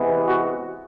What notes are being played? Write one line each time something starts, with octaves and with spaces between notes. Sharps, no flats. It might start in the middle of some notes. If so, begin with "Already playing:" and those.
Already playing: C3 E3 G#3 B3
F#4